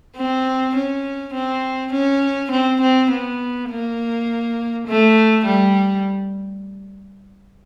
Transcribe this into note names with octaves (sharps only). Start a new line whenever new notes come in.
C4
C#4
C4
C#4
C4
C4
B3
A#3
A3
G3